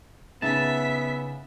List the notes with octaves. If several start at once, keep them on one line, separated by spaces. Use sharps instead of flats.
C#3 B3 D#4 E5 A5 B6